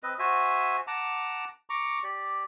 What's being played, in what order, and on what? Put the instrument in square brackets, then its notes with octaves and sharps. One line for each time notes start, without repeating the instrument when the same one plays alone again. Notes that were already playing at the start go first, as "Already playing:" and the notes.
[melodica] C4 B4 D#5
F#4 C5 E5 G#5
F#5 A5 A#5 D6
A#5 C#6 D6
G4 D5